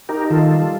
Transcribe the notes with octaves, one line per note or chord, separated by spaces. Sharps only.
D#4 G4 A#4
D#3 F4 A4
G3